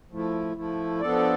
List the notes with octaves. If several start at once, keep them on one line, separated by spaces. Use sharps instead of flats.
F3 A3 E4
F3 A3 E4
F3 B3 D4 A4 D5